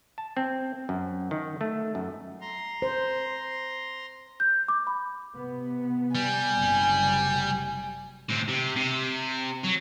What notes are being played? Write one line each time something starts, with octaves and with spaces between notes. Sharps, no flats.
A5
C4
F#2
D#3
A3
F#2
A#5 C6
C5
G6
D6
B5
C3 B3
G3 G#5
F#1 C3
A2 C4
C3
C3
F#3